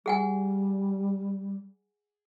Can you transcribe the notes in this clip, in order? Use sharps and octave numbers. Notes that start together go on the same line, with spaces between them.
G3 G#4 F#5 G#5